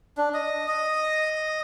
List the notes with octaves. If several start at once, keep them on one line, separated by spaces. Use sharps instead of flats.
D4
D#5
D#5